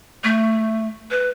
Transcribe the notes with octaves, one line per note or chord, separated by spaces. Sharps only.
A3
B4